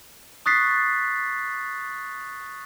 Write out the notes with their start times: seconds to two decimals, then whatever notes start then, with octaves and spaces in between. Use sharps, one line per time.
0.46 C#6 D#6 F#6 A6 B6 C7